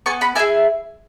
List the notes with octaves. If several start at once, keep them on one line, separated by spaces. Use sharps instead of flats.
B3 G#5 C#6
F#5 B5
E4 G#4 E5 G#5